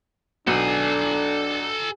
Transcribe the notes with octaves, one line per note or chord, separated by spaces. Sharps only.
B1 D4 A4 G#5